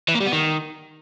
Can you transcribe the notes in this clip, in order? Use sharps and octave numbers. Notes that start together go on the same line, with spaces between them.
E3
A#3
G3
B3
D#3